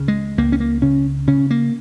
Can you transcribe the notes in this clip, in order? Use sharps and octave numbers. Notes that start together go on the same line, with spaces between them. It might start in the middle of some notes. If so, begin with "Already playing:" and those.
Already playing: C#2 C#3
G#3
C#2 A#3
C#4
A#3
C#3 C#4
C#3 C#4
A#3